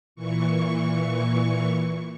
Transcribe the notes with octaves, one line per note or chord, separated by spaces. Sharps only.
A#2 E3 C#6